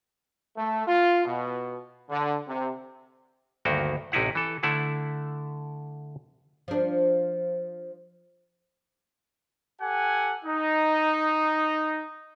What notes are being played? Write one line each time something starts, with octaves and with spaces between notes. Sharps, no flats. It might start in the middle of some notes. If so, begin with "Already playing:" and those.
A3
F4
B2
D3
C3
D2 G2 D#3 A#3 F#4 G5
A1 C3 D#4 E4 F#5
E3 A4
D3 A3 E4 F#5 A5
F3 D4
G4 A4 F#5 G#5
D#4